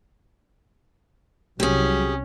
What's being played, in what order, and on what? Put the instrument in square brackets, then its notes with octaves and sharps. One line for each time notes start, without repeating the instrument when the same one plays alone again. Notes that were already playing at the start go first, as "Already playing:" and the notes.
[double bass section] C2 [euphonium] F#3 [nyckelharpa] C#4 [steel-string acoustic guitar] G4 G#4